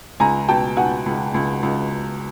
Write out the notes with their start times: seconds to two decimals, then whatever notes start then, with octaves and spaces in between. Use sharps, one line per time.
0.20 C#2 G#5 A#5
0.48 B2 G5 A5
0.77 B2 F#5 G#5
1.06 C#2
1.34 C#2
1.63 C#2